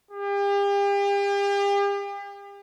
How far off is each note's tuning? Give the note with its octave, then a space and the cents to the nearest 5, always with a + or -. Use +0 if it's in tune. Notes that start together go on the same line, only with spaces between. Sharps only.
G4 +40